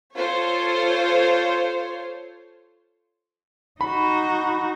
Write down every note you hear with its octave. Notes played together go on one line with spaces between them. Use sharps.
F4 A4 C5 C#5
D#4 F#4 B5